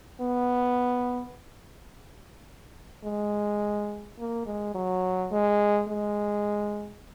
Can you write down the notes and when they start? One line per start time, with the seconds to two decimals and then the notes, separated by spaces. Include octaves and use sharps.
0.21 B3
3.05 G#3
4.19 A#3
4.46 G#3
4.74 F#3
5.31 G#3
5.89 G#3